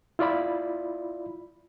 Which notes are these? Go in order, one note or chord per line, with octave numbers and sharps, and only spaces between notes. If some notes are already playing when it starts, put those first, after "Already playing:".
E4 F4 D5 B5